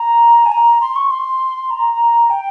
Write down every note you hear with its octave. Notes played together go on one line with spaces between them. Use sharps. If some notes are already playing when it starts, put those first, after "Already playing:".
Already playing: A#5
G#5
A#5
C6
C#6
C6
A#5
G5